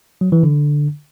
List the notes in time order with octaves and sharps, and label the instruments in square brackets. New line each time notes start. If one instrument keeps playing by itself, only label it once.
[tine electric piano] F#3
E3
D3